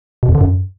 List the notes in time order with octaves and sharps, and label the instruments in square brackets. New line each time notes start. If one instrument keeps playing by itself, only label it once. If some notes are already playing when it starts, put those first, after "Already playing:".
[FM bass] B2
F2
D3
F#2